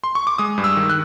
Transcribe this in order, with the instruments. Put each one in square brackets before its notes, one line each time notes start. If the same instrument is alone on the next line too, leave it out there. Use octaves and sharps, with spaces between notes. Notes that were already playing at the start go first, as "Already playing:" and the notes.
[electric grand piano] C6
C#6
D6
G#3 D#6
G2
E6
D#3
F#6